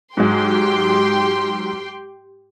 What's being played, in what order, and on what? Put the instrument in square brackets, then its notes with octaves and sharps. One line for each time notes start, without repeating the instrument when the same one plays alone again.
[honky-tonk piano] G#2 F#3 G#3 [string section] G4 G5 C6